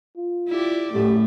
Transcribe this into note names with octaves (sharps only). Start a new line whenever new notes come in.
F4
E4 G4 D5
F#2 A2 A3 G4